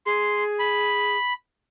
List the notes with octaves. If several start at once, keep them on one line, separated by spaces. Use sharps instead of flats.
G#4 C6
B5